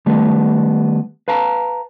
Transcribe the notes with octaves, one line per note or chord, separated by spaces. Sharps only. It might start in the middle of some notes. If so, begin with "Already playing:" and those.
D#3 G3 A3 B3
B4 F5 A5 A#5